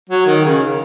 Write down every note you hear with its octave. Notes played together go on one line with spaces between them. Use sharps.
F#3
D#3
C#3